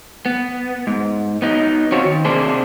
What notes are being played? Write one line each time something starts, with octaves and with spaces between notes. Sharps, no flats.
B3
G#2
B3 D#4
C4 C#4 F4 F#4 C5 C#5
D#3
C3 A#3 D4 G#4 C5